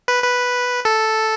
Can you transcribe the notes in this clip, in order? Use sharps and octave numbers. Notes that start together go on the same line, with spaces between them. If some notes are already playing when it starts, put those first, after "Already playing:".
B4
B4
A4